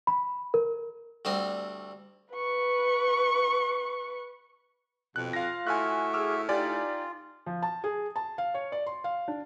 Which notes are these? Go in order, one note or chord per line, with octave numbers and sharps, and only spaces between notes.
B5
A#4
D2 D3 G3 C4 D#5 C6
B4 C#6
F2 B2 F#6
F4 F5 A#6
A2 F#4 E5 G#5 F6 F#6
G#4 D6 E6 F6
D#4 F4 G4 D5 G#5
F3
A5
G#4
A5
F5
C#5
D5
C6
F5
D4